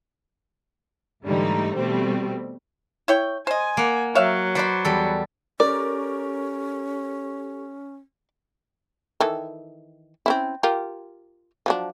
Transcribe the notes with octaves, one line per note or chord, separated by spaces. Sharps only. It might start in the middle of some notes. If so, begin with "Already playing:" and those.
G#2 D3 E3 G3 A3 D#4
B2 G3 A3 C4
E4 C#5 G5
C5 D#5 G#5
A#3 F#5
F#3 C#5 E5 F5
B4 C5 D5 F#5 B5
E2 G3 A4
C#4 G4 A4 A#4 D5 C#6
D#3 E3 A4
C4 C#4 E4
F4 G4 A#4
F3 F#3 D4